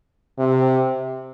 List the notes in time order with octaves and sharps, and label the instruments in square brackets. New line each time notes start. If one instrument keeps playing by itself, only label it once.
[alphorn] C3